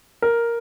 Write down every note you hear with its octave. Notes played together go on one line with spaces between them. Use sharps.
A#4